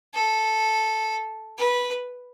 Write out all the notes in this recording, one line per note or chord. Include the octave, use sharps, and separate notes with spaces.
A4
B4